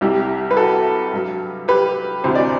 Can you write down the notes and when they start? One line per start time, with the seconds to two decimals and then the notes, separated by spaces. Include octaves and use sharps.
0.01 C2 C3 G3 E4 G4
0.51 B4
0.57 F#4 A4
1.13 G2 F#3
1.68 G4 B4
2.24 D2 C3 E3 C5
2.35 D5